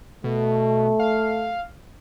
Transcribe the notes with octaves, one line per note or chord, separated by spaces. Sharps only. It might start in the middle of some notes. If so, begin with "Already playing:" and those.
B2 A3
F5